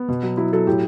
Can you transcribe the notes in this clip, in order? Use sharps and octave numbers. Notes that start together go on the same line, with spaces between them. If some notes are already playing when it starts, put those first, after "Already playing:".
Already playing: B3
B2
F#3
F#3 E4
F#3 A4
A2 G4